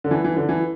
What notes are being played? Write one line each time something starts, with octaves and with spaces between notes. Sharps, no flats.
D3
E3
E3
D3
E3